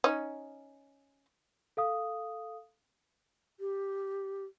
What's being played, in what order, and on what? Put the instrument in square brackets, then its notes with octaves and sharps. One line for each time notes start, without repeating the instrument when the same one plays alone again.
[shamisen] C#4 D#4
[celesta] A4 F5 D#6
[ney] G4